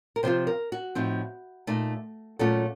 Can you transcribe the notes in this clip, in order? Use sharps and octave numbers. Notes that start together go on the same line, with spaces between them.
A#4
C3 F3 C4 F4 C5
A#4
F#4
A2 F3 C4 D#4
A#2 A3 D#4
A#2 F#3 A3 C#4 F4 A4